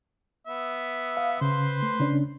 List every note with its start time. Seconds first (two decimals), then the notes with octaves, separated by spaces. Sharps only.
0.47 B3 E5
1.17 F5
1.41 C#3 B4 C5 C6
1.82 A3
2.00 C#3 C#4 D4